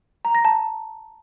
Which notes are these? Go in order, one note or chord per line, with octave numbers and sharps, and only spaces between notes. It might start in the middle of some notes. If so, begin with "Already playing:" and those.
A#5
A#6
A5